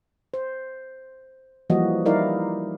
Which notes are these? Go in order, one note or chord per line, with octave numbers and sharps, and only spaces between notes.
C5
E3 F3 G3 A#3 F#4 D#5
G3 D#4 E4 A#4 D5 F5